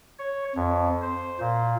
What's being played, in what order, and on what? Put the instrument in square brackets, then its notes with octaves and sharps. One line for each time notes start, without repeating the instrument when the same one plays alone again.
[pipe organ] C#5
F2
C5
A#2